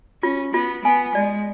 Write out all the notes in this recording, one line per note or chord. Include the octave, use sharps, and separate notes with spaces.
C#4 F4
B3 F4
B3 G#5
G#3 D5